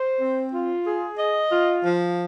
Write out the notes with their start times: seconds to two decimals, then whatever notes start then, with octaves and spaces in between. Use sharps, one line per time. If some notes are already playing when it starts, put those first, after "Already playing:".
Already playing: C5
0.21 C4
0.54 F4
0.86 G#4
1.19 D#5
1.51 F4
1.84 F3